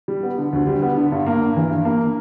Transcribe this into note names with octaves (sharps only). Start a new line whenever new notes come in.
G3
B3
D3
D2
G3
B3
D3
G2
A#3
G2
E3
G2
A#3